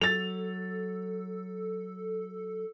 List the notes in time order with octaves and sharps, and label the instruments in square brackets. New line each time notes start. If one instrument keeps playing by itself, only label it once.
[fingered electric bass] F#3 [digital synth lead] A4 [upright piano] A6 F7